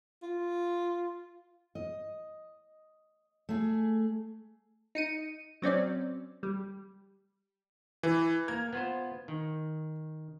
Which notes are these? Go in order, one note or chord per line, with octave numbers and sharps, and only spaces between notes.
F4
D#5
A3 G#4
D#4 C#7 D#7
F#3 C4 C#4 D5
G3
E3
A#3 A#4 G#6
B3 F4 C5
D#3